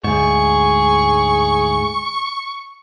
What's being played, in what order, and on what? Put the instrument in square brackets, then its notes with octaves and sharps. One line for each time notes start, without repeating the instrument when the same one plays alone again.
[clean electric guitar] D2 G#2 [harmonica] G#4 [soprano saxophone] C#6